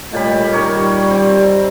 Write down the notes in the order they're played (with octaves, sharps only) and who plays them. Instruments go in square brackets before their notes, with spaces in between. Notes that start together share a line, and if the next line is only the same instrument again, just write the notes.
[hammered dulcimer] A#2 G3 B5 [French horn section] A3 C#5 D#5
[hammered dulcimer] D#3 A#4 C#5 [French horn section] G3
[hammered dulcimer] C4